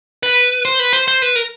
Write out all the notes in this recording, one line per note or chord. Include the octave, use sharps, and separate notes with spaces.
B4
C5
B4
C5
C5
B4
A#4